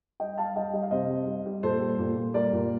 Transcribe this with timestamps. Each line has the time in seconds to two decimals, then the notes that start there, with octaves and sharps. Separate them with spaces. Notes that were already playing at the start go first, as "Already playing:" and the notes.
0.20 G3 D#5 G5
0.38 G3 F5 A5
0.56 G3 D#5 G5
0.73 G3 D#5
0.83 F5
0.91 C3 C5 D#5
1.09 G3
1.27 G3
1.46 G3
1.63 A#2 A4 C5
1.81 G3
1.99 A#2
2.17 A#2
2.34 G3 A#4 D5
2.53 A#2